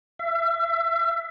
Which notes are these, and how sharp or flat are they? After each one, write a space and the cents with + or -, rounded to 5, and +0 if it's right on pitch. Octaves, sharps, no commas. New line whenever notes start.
E5 +30